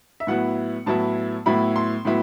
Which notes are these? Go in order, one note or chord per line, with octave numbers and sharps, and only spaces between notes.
E5
A2 F#3 B3 E4 F#5
A2 F#3 B3 E4 A5
A2 F#3 B3 E4 B5
C6
A2 F#3 B3 E4